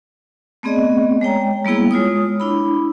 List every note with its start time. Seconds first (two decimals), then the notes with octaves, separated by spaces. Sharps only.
0.63 A3 B3 C4 G#4 D5 D#5
1.21 G#3 C#5 G5 A#5
1.65 G3 A#3 B3 E4 G#4
1.91 G#3 F4 C#5 D#6
2.40 D4 E4 B5